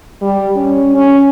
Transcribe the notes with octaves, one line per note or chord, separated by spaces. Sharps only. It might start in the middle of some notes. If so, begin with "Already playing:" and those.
G3
C#4
C#4